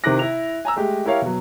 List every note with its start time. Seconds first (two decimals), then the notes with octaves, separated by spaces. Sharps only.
0.04 C3 D#3 E4 D6 F#6 A#6
0.19 E4 F7
0.65 G#5 A#5 E6
0.76 G#3 A3 G4
1.06 E4 G4 A#4 C#5 F5
1.22 B2 F#3